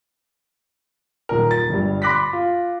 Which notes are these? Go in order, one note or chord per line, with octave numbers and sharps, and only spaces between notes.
D#1 A#4
A6
G1 G2
B5 C6 D6 F#6 A#6 B6
F4